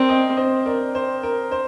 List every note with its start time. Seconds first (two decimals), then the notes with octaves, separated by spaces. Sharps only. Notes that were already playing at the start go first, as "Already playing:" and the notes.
Already playing: C4 A#4 D5
0.09 D#5 G5
0.37 C5 D#5
0.66 A#4 D5
0.95 C5
1.23 A#4
1.52 C5